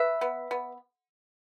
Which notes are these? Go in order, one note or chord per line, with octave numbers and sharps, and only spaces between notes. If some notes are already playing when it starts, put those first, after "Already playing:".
Already playing: B4 E5
B3
B3